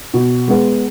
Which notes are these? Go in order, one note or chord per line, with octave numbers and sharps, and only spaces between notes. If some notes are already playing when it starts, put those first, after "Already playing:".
B2
G#3 B3